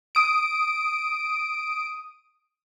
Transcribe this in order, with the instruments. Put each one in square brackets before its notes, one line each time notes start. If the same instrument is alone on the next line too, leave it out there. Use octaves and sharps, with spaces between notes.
[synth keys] D#6 D7